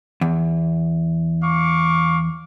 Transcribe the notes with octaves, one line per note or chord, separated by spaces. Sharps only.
E2
F5 C#6 D6